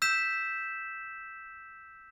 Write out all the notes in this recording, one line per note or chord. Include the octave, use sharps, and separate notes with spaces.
E6 G6 B6 E7